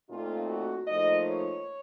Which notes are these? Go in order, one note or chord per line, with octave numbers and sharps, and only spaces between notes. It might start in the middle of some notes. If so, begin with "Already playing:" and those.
A#2 A3 C4 D#4 F4
F#4
A#2 F3 A3 D#4 D#5
C#5